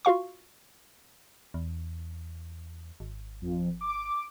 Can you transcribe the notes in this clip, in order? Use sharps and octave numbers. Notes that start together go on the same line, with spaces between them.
F4 F#4 F5 C#6
E2
G#1
F2
D6